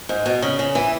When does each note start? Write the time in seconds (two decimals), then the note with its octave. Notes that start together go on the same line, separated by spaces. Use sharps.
0.09 G#2
0.26 B2
0.42 C#3
0.59 C#3
0.75 E3